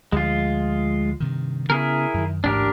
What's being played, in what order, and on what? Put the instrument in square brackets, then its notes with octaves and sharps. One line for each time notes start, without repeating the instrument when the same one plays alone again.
[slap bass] D2 F3 [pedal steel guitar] G#3 F4
[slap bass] G2 C3 D#3
[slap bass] C#3 B3 [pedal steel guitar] E4 G#4 A#4
[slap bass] F#2 D#3
[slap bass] A1 D2 G#2 [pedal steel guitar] D4 G4 A#4